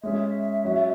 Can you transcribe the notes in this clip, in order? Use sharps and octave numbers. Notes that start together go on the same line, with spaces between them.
G#3 C#4 G#4 E5
F#3 C#4 F#4